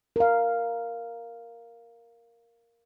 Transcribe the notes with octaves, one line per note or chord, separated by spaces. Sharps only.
A#4 F5